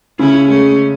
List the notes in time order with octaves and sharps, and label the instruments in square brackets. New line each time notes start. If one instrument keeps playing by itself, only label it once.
[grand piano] C#3 [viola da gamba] C#4 E4
[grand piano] G#3 [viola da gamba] A3 C#4